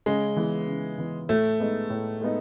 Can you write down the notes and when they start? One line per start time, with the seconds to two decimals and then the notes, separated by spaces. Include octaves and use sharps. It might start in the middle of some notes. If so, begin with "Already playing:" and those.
0.06 C#3 G#3
0.37 E3 B3
0.68 C#3
0.98 E3 B3
1.29 A2 A3
1.60 G#3 B3 D#4
1.90 A2
2.21 G#3 B3 D#4